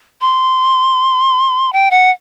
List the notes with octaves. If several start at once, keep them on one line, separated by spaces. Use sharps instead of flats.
C6
G5
F#5